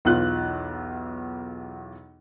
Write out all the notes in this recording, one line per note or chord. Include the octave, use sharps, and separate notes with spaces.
B1 E2 F4 F#6